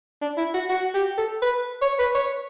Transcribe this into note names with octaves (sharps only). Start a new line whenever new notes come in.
D4
E4
F#4
F#4
G4
A4
B4
C#5
B4
C#5